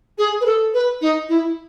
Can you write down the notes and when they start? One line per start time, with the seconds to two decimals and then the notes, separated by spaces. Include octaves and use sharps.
0.18 G#4
0.41 B4
0.46 A4
0.74 B4
1.01 D#4
1.29 E4